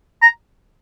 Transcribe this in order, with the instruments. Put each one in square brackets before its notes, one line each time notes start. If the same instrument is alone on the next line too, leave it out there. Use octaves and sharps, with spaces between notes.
[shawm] A#5